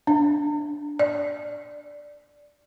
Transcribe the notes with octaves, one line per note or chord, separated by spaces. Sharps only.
D4
D5